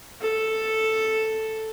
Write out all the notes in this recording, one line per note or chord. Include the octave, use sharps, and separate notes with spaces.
A4